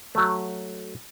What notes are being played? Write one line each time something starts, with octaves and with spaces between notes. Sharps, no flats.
F#3 A3